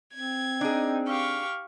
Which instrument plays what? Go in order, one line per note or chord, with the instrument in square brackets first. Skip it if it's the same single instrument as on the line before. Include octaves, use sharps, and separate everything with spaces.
[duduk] C4 [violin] G#6
[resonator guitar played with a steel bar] D4 G#4 [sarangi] D#4
[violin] G4 C#6 [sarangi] F5